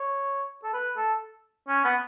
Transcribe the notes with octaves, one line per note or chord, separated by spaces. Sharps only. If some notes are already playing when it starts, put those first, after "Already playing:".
Already playing: C#5
A4
B4
A4
C#4
B3